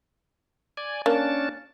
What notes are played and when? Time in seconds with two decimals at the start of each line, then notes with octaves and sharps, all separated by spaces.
0.77 D5 G#5
1.06 A#3 C#4 D4 A5